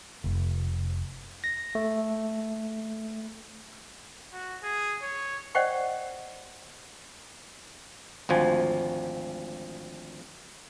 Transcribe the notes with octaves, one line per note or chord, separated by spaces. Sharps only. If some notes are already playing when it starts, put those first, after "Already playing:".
F1
A#6
A3
F#4
G#4
C#5
C5 D5 D#5 F#5 G5 C#6
G#1 D2 F3 G#5